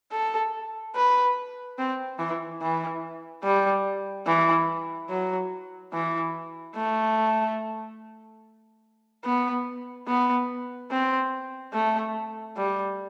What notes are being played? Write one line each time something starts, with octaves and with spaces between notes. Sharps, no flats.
A4
B4
C4
E3
E3
G3
E3
F#3
E3
A3
B3
B3
C4
A3
G3